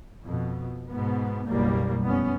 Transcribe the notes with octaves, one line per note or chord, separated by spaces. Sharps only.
F2 B2
G#2 B2 B3
F#1 B1 B2 G3 A#3
F1 B3 C#4